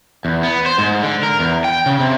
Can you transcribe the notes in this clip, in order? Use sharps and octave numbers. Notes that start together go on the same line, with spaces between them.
E2
B3
C5
G#2
D3
A#4
E2
G5
C#3
C3